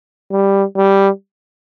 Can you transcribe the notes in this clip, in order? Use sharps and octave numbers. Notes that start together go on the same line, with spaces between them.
G3
G3